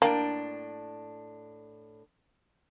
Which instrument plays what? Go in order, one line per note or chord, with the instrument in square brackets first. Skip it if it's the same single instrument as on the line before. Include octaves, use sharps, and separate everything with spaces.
[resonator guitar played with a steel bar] A2 D4 G5 [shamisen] A#3